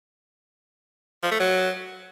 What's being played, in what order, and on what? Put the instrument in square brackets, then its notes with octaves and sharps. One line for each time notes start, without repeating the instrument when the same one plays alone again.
[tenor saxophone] F3
A3
F#3